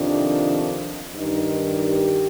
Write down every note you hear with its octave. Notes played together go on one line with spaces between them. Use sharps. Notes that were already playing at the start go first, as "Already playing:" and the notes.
Already playing: F2 C3 D#3 D4
G2 D#3 D#4
G4